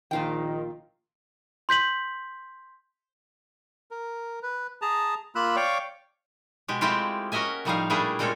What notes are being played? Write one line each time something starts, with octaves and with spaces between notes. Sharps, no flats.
A#1 A#2 D#3 F4 G5
C6 G6 B6 F#7
A#4
B4
G#4 A5 A#5
A#3 F4 B5 E6 F#6
C#5 D5 F5 G5 C#6 D6
B2 G#3 G4
G#3 A3 C4 E4 F4 G4
C#4 F#4 A#4 D#5 E5 G#5
A2 F3 G3 D#4 G#4 F5
A#2 G3 A3 D4 E4 G#4
A#2 G#3 C4 C#4 A4 C#5